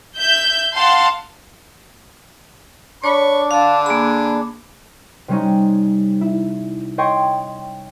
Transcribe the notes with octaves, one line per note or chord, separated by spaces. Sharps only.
E5 G6
F5 F#5 A5 C6
D4 C#5 B5 C#6
D3 F5 A5
A#3 G#4 B5
C3 G3 C#4 D#4
E4
C#5 D#5 G5 C6 C#6